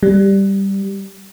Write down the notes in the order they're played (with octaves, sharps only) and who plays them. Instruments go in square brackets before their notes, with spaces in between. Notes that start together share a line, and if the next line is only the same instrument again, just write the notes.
[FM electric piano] G3